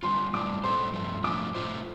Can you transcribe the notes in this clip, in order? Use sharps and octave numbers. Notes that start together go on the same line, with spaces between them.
D3 G3 F4 C6
A2 G3 D4 D6
A2 G3 F4 A4 C5 C6
G2 F3 A3
A2 F3 A3 D4 F4 D6
A2 A3 F4 C5